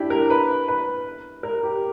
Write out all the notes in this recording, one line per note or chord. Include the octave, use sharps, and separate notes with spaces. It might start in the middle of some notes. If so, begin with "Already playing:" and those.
Already playing: D4 E4 G4
A#4
B4
B4
A#4
G4